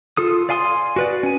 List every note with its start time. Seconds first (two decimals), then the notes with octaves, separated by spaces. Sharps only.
0.17 F4 A4 D#6
0.49 D5 F5 G#5 C6 D#6
0.96 F#4 B4 D5
1.23 C#4 G#5